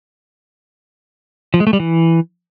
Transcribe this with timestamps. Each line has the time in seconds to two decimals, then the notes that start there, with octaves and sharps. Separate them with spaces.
1.54 F3
1.60 G#3
1.67 A3
1.73 G3
1.80 E3